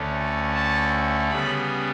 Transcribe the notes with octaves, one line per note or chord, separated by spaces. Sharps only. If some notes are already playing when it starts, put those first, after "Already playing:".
Already playing: D2 D3 A3 C#4
A5
C#3 G3 B3 B5